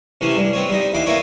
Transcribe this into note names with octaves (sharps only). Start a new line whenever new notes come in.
C3 E3 A3 C#4
G2
B3 C4 C#5
G3 D#4
D#2 E3 F5 D6
A#3 B3 E4 C#5 D5